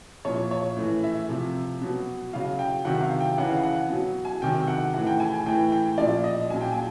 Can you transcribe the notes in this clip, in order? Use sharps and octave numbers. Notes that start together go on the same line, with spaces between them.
A#2 F3 C#5
C#5
A2 E3
E5
C3 F3
B2 F#3
C#3 F#3 F5
G5
C3 D#3 F#3 F#5
F5
G5
C#3 E3 F#5
F5
F#5
B2 F#3
G#5
C3 D#3 F#3 G5
F#5
A2 E3 F#5
G5
G#5
G#5
A2 E3 G5
G5
A#2 F3 D5
D#5
A#2 F#3 G#5
G5
G#5